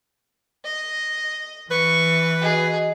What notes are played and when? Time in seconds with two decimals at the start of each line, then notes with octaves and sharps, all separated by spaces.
0.65 D#5
1.71 E3 B4 C#6
2.42 F#4 G#4 D#5